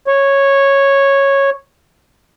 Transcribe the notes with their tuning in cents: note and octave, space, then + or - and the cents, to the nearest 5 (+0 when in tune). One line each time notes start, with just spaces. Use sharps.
C#5 -10